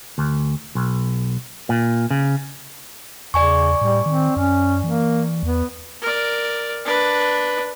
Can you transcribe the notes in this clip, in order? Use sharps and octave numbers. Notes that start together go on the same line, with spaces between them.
D2
B1
A#2
C#3
E2 C#3 D5 G#5 C#6
A2 G3
D#3 C4
F#2 C#4
E3 A#3
E2 B3
A#4 D5
D4 B4